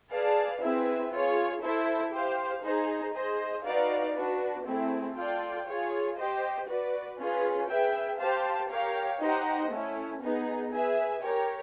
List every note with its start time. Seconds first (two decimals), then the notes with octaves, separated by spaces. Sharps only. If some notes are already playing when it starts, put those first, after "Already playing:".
0.11 G#4 B4 D5 F5 A5
0.61 C4 E4 G#4 B4 E5
1.12 F4 G#4 C#5
1.62 E4 A4 C5
2.12 G4 C5 F5
2.63 D#4 G#4 C5
3.14 G#4 C5 D#5
3.64 D#4 F#4 B4 D5 F5
4.15 D4 F#4 B4
4.65 A3 C4 E4 G#4
5.15 F4 A4 D5 G5
5.67 F4 G#4 C#5
6.17 G4 C5 D#5
6.68 F#4 B4 D5
7.18 C#4 F4 G#4 B4
7.69 G#4 B4 E5 G5
8.19 G4 C5 F5 A5
8.70 G4 A#4 C#5 F5
9.20 D#4 G4 C5 D#5 F#5
9.70 A3 C#4 E4
10.21 B3 D#4 G#4 B4
10.72 G#4 B4 E5 G#5
11.22 G4 A#4 C#5